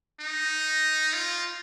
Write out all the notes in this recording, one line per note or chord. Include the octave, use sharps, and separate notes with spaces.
D#4
F4